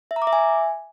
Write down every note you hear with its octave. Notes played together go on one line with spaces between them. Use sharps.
E5
A#5
D6
E5
G#5